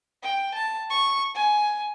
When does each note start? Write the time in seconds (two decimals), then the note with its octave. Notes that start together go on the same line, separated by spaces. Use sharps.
0.23 G5
0.55 A5
0.90 C#6
1.35 G#5